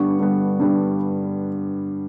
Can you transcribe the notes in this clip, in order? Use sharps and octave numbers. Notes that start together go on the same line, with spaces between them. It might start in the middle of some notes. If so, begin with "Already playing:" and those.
Already playing: G2 D3 G3 B3 C#6
G2 D3 G3 B3
G2 D3 G3 B3